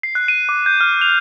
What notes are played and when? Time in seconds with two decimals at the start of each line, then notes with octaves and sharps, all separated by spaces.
0.03 C7
0.15 F#6
0.28 D#7
0.49 D6
0.66 G6
0.81 F6
1.01 F7